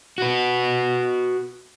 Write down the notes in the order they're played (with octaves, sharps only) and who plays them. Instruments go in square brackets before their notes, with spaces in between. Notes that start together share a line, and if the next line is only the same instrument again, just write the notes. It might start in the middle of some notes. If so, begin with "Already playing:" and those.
[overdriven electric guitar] F#4 B4